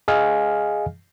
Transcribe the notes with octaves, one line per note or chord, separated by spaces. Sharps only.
G#4 D#5 F5 G#5 F6